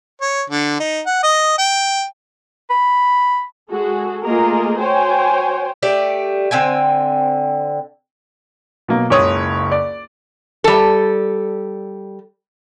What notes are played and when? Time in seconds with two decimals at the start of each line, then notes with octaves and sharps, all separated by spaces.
0.21 C#5
0.50 D3
0.80 D#4
1.06 F#5
1.23 D#5
1.58 G5
2.70 B5
3.72 G#3 F#4 G#4 A4
4.24 A3 A#3 F4 G#4 A#4 D#5
4.79 F#4 C5 C#5 G5 G#5
5.83 A3 G4 D5
6.51 D3 C4 G5 G#5
8.88 B2 F#3 A#3
9.10 F#1 C#2 C#5 D#6
9.72 D5
10.64 G3 A4